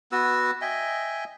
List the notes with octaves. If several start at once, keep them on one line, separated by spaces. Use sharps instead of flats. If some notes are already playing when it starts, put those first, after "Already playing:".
B3 F#4 B4 E6
D#5 E5 G5 G#5